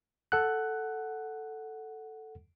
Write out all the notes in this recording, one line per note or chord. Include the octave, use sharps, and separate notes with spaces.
A4 F#5 F#6